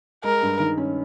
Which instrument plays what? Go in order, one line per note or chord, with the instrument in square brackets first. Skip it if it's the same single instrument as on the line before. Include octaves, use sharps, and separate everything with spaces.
[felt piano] G#3 [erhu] A#4
[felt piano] G2
D#3
C#4